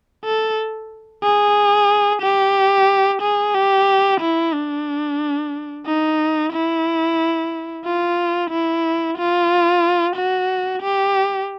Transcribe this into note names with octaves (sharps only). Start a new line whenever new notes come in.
A4
G#4
G4
G#4
G4
E4
D4
D#4
E4
F4
E4
F4
F#4
G4